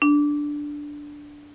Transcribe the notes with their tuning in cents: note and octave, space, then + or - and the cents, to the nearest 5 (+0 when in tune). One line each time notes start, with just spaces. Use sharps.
D4 +0